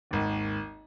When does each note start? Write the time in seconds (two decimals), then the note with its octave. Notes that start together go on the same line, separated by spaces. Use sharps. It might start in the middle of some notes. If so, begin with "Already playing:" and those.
0.11 G#1 D#2